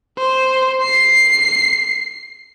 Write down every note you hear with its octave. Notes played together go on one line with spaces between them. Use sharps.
C5
C7